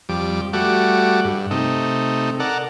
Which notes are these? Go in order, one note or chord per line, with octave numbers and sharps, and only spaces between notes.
F2 G3 D6
G3 A3 F#4 D6
G2
C3 A3 D#4
A4 A#4 D5 F#5